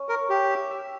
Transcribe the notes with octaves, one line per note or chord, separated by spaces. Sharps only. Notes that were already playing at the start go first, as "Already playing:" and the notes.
Already playing: C#4
A#4 C#5
G4 E5
E5
E5